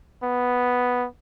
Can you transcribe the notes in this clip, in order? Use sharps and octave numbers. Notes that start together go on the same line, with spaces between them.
B3